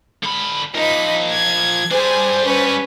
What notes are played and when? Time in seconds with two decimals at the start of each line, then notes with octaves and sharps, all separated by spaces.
0.23 D3 B5
0.75 F3 D#4 A#4 B5
1.31 G#6
1.91 G3 D4 G#4 C5 G#5
2.44 C#4 B4